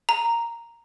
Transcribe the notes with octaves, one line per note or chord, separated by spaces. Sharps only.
A#5